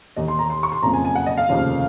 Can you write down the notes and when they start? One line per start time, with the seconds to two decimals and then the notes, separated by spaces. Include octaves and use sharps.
0.16 D#2 D#3 D#5
0.28 C6
0.39 A#5
0.50 C6
0.63 C#6
0.72 C6
0.82 F#1 F2 C#3 F3 A#5
0.93 G#5
1.05 G#5
1.15 F#5
1.26 D#5
1.38 F5
1.49 F1 D#2 C#3 F3